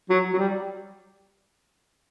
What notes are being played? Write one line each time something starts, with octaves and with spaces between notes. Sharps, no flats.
F#3
F#3
G3